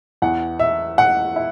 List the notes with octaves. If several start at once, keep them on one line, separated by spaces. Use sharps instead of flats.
E2 E3 F#5
E5
F#5
E4